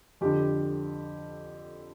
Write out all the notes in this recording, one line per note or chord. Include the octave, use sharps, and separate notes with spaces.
F2 D3 G4